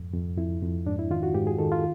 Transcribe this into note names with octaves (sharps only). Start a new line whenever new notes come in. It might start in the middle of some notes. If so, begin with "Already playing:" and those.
Already playing: F2 G#2
F2
F2 E4
F2
G#2 D4
E4
D#3 F4
F#4
G#2 G4
G#4
D#3 A4
F4